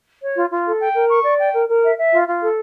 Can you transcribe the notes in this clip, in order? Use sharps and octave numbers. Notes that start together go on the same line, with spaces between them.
C#5
F4
F4
A4
G5
A#4
C#6
D5
G5
A#4
A#4
E5
E5
F4
F4
A4